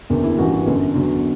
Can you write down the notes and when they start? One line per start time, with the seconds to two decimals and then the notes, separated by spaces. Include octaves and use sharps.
0.10 F#1 E2 D3
0.23 E4
0.37 A1 G2 E3 F#4
0.52 F#4
0.67 G1 F#2 D3
0.95 E2 D3 F#3